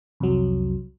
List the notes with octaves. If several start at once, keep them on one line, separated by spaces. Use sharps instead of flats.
C2 F2 F#3